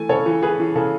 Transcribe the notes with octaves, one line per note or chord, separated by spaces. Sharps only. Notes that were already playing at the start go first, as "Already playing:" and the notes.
Already playing: E3 A3 G#5
C#3 A4 C#5
E3
E3 G#4 B4
E3
C#3 A4